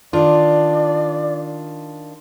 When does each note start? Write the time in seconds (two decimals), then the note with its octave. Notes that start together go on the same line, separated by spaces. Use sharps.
0.13 D#3 D4 F4 D5